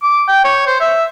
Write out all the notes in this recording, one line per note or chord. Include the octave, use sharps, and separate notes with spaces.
D6
G5
C#5
C5
E5